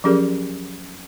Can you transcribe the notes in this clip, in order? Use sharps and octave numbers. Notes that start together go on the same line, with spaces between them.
F3 F#3 C#4 G4 G#4 A#4